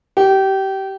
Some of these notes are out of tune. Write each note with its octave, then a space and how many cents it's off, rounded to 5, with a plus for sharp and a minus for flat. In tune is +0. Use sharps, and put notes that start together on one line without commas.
G4 -25